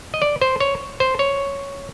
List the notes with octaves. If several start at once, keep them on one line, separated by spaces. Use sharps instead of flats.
D#5
D5
C5
C#5
C5
C#5